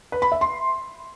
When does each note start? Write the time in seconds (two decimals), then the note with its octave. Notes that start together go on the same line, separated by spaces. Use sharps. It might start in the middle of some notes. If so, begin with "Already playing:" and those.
0.12 B4
0.22 B5
0.32 E5
0.41 C6